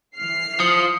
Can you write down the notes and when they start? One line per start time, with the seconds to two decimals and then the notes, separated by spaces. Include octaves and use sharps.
0.16 E3 F6 C7
0.60 F3 D#6 C#7